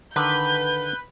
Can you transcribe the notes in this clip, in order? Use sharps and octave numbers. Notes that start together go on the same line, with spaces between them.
D3 D#3 B4 G6